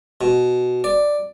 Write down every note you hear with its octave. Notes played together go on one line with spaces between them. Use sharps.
B2
D5